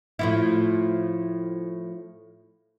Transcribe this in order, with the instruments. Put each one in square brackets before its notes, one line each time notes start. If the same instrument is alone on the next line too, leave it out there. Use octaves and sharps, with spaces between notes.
[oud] A2 F3 E4